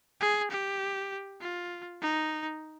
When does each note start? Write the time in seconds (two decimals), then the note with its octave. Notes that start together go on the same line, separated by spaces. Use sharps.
0.21 G#4
0.50 G4
1.40 F4
2.02 D#4